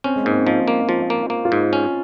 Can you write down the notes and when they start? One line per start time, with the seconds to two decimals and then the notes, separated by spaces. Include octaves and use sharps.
0.04 C4 C#4
0.16 G#3
0.24 G#2 A#3
0.31 C4
0.39 C#4
0.46 F3 D#4
0.68 A#3
0.89 F3 F4
1.10 A#3
1.30 A#3
1.45 F4
1.52 G#2
1.73 C#4